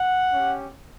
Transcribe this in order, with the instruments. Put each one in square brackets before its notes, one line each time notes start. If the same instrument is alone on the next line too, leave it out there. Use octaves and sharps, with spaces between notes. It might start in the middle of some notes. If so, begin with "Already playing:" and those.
Already playing: [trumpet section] F#5
C#4 G4